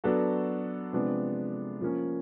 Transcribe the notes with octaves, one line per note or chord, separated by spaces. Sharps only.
F#3 B3 D4 F#4 A4
C3 F3 G#3 B3 D4
F3 A#3 C#4